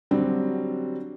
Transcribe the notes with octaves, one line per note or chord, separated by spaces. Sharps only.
D3 F#3 G3 C4